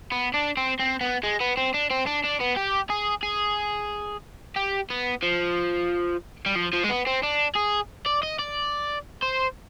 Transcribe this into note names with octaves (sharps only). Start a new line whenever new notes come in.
B3
D4
C4
C4
B3
G#3
B3
C4
D4
C4
D4
D4
B3
G4
G#4
G#4
G4
B3
F3
G3
F3
F3
G#3
B3
C4
D4
G#4
D5
D#5
D5
C5